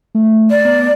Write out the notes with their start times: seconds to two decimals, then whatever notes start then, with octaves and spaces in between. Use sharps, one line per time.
0.15 A3
0.50 D5
0.65 B3